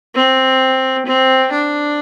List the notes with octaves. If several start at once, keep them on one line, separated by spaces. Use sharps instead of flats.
C4
C4
D4